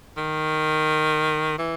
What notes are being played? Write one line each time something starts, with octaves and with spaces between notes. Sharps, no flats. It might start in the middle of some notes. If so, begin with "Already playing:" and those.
D#3
E3